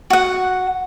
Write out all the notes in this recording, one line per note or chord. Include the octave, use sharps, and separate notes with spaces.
F#4 F#5